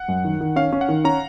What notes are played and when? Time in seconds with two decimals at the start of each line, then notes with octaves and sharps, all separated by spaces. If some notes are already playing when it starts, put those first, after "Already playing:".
Already playing: F#5
0.08 F#2
0.24 D#3
0.41 D#3
0.56 C#4 F5
0.72 C#4
0.81 F#5
0.88 D#3
1.04 C#4 A#5